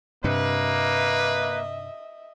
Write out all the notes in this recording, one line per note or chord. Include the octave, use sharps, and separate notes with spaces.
G2 C3 A#3 B4 D#5 E5